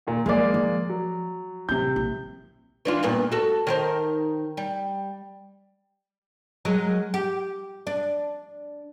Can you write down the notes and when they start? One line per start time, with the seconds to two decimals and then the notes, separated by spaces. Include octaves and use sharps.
0.07 D#2 A#2
0.26 F3 F#3 G#3 A#3 D5
0.54 F3
0.89 F#3
1.69 A1 C3 F#3 G6
1.96 A#1
2.85 E3 D4 F4
3.03 G2 A#2 B3
3.32 F#4 A4
3.67 D#3 A#4 C5
4.57 G3
6.65 F#3 G#3 A#4
7.14 G4
7.87 D4